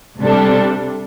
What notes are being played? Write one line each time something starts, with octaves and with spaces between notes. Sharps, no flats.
C3 G3 D4 A4